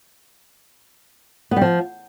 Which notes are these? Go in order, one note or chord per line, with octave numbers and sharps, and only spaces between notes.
B3
G3
F3